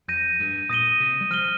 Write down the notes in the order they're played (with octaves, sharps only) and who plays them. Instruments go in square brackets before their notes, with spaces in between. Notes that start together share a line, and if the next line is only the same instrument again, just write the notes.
[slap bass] F2 [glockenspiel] G6 A#6 D#7
[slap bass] G2
[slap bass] A#2 [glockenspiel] D#6 A#6 D#7 G7
[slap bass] C3
G3
[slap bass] F3 [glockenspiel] F6 D#7 G7